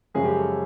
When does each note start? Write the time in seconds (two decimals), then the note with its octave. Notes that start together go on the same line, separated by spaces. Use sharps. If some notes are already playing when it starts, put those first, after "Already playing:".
0.14 F#2 C#3 F3 G#3 C#4 G#4
0.25 G4
0.36 A4